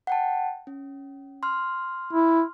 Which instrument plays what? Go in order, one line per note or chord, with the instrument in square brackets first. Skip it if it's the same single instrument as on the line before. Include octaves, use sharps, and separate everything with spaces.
[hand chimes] F#5 G5 A5
C#4
C6 F6
[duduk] E4